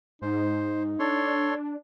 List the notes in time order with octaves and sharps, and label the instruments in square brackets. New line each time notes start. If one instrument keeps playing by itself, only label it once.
[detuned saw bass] G#2 [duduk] D#4 [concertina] C5
[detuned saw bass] D4 [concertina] A4 C#5 C6